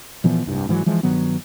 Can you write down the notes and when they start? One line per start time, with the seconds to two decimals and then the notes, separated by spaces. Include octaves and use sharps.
0.24 A#2 E3 F3 B3
0.46 F1 C2 G2
0.69 G#2 E3 F#3
0.86 E3 F3 G#3
1.03 G2 D#3 F#3 B3